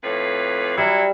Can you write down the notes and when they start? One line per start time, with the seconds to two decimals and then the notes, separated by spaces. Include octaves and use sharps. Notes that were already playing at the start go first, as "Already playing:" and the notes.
0.03 F2 A2 B4
0.78 F#3 G3 E4 E5